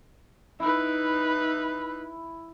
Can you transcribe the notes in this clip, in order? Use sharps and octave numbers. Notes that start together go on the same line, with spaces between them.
D#4 E4 B4